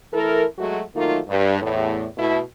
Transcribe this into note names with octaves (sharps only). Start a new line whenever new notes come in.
E3 A3 E4 A4 A#4
F#3 G#3 A3 F#4
D#3 F#3 A3 A#3 D#4 F4
G2
E2 A2
B2 A3 E4